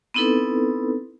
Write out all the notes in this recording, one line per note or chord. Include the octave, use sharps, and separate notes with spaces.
B3 C4 D#4 E4 A4 B4